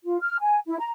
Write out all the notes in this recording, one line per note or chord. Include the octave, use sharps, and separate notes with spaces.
F4
F6
G#5
E4
A#5